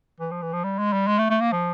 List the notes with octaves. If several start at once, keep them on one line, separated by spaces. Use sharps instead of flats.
E3
F3
E3
F3
G3
G#3
G3
G#3
A3
A3
A#3
F3